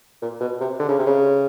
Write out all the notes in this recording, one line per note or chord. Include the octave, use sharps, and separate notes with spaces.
A#2
B2
C3
D3
C#3
C3
C#3